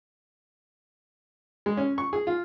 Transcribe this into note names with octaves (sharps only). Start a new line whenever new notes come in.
G#3
C#4
C#6
G#4
F4